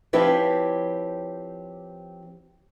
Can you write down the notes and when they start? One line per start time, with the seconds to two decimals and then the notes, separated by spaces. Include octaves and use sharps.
0.13 F3 C4 E4 G4 B4 C#5